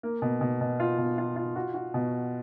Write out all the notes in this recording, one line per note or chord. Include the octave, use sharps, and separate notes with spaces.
A#3
B2
B2
B2
F4
B2
F4
F4
F#4
F#4
B2